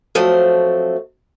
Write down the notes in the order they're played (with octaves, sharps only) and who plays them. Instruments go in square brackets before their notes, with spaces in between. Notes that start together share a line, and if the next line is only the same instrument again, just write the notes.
[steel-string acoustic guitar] F3 F#3 A3 C4